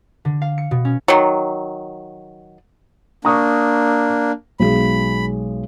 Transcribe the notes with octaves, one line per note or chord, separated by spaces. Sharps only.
D3
F5
C#7
B2
C#4
D#3 F#3
A#3 D4 A#5 C#6 D#6
B1 G#3 G#4 B5